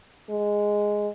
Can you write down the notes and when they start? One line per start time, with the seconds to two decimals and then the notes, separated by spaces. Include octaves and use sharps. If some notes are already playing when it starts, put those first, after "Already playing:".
0.30 G#3